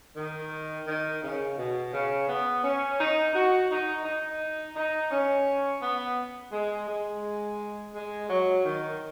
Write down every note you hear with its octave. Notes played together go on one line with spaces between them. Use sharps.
D#3
D#3
C#3
B2
C#3
B3
C#4
D#4
F#4
D#4
D#4
D#4
C#4
B3
G#3
G#3
G#3
F#3
D#3